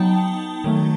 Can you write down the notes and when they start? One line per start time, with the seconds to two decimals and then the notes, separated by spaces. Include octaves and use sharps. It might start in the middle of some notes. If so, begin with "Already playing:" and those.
Already playing: F#3 B3 D#4 G5 A5
0.64 D#3 F#3 A3